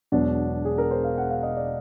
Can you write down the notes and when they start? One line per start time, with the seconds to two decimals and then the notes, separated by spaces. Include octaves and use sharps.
0.12 E1 E2 B2 F#3 D4
0.65 G#4
0.78 A#4
0.91 C5
1.04 F5
1.18 F#5
1.30 F5
1.43 D#5
1.57 D5